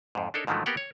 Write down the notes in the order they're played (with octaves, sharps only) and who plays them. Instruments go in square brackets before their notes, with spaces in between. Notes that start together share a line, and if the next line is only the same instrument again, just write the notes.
[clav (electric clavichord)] F2 G#2
D4 D#4 A4 A#4 C#5
G#2 D3 D#3 F3 F#3 A3
A#3 B3 G4 A#4 F#5 G5
C#5